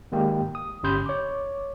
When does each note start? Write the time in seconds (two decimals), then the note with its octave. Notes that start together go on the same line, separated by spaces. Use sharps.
0.12 D#3 G#3 A#3 G4 G5
0.55 D#6
0.83 G1 C#4 G4 B5 C6 G6
1.06 C#5 D6